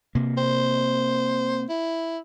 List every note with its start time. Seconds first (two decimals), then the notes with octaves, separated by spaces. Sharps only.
0.15 C3 A#3
0.37 C5
1.70 E4